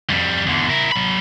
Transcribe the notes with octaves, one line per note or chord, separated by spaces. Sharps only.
F2 G3
E2 D3
E4 A#4
F#3 B5